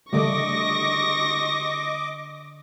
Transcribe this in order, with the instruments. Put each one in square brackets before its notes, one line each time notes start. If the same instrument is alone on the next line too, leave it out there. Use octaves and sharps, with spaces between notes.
[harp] D3 [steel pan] G3 A3 [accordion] D#5 D6 [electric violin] C#6 A#6